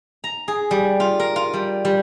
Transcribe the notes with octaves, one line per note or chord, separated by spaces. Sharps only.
A#5
G#4
G3
F4
A#4
F4
G3
G3